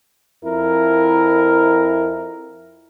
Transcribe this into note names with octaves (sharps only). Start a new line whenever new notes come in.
F2 E4 A#4